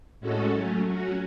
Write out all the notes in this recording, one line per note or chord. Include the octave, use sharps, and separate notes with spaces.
A2 G#3 C#4 F#4 A4
F#3 A3 C#4
F#3 C#4 F#4